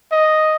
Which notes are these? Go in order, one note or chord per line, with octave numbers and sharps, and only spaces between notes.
D#5